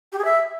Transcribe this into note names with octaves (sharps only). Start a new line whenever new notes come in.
G4
G#4
E5